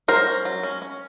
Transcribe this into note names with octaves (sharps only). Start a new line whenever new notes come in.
F#3 A#4 C5
C#4
F#3
C#4
C#4